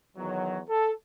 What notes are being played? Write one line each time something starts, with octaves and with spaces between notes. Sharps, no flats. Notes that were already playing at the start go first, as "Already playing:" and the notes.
E2 D#3 F#3
A4